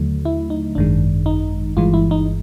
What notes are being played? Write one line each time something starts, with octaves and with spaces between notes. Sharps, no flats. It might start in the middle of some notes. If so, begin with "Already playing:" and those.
Already playing: D#2 D3 F#3 A3
E4
D#4
G#1 F#2 D#3 G#3 D4
D#4
G1 G2 E3 G#3 F4
E4
D#4